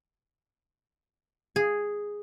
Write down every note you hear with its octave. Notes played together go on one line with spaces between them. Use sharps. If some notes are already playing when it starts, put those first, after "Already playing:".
G#4